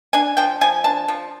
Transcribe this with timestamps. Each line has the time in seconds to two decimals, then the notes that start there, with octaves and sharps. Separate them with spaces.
0.13 D4 G#5
0.37 F3 G5
0.61 F3 G#5
0.84 D4 A5
1.08 F3